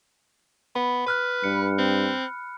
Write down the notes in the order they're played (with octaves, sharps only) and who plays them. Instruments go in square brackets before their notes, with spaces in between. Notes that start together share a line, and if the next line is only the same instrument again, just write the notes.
[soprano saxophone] B3 [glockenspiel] B5
[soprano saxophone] B4 [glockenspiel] B5 F6 F#6
[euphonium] G2 [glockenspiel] C#7
[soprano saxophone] C4